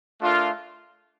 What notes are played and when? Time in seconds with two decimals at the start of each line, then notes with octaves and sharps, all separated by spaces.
0.21 A3 D4 F4 A#4